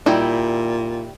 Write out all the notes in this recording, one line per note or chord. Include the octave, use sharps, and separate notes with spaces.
A#2 D#3 G3 E4